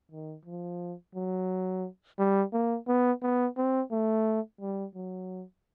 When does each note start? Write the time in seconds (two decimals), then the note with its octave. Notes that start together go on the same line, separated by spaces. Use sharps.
0.11 D#3
0.45 F3
1.15 F#3
2.19 G3
2.53 A#3
2.88 B3
3.22 B3
3.57 C4
3.92 A3
4.61 G3
4.95 F#3